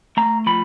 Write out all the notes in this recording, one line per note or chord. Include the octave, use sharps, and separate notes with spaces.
A3 A#5
F3 B5